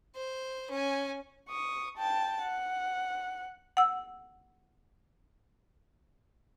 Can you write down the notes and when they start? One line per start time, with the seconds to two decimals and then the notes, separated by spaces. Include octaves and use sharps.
0.16 C5
0.71 C#4 G#5
1.49 C#6 D#6
1.98 G5 A5
2.42 F#5
3.77 F#5 E6